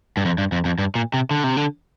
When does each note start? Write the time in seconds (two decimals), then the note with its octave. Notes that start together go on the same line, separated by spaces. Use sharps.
0.17 G2
0.25 F2
0.38 G2
0.52 F2
0.65 F2
0.79 G2
0.95 A#2
1.14 C3
1.31 D3
1.44 C3
1.57 D3